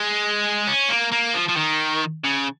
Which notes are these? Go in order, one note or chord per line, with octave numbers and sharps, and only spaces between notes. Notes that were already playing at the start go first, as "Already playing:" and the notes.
Already playing: G#3
C#4
A#3
A#3
F3
F3
D#3
C#3